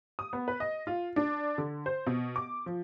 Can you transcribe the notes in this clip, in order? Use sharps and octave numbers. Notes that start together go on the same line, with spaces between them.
D#6
B3
B4
D#5
F4
D4
D3
C5
B2
D6
F3